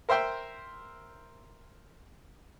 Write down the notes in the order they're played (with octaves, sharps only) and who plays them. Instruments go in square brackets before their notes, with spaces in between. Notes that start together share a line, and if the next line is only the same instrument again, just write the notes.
[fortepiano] A#4 C5 E5 G5 C6